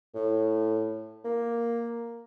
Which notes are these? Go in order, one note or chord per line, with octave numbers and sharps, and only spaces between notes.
A2
A#3